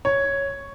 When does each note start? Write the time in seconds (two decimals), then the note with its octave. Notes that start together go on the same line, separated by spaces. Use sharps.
0.05 C#5